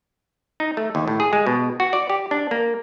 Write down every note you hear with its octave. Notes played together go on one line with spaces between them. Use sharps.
D#4
A3
D#2
A2
G#4
G#3
B2
F#4
D5
G4
D4
A#3